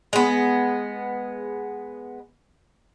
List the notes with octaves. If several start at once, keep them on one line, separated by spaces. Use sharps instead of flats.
G#3 B3